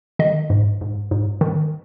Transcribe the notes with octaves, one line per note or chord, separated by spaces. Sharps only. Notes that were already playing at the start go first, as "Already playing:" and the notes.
D#3 D#5
G#2
G#2
G#2
D#3